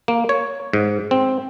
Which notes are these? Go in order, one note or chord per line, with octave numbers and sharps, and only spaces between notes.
A#3
C#5
G#2
C4